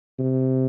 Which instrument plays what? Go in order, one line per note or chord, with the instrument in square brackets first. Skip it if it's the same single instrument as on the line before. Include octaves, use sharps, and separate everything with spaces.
[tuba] C3